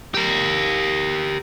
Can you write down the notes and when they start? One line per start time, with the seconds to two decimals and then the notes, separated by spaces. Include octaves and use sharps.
0.14 G4 A#4